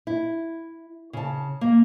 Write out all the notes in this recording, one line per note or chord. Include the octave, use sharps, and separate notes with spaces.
E4
C#3 A5
A#3